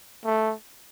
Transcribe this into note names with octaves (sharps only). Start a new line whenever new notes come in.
A3